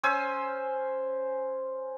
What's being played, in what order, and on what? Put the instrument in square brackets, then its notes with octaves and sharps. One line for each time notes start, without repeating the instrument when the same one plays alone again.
[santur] C#4 C5 G#5 E6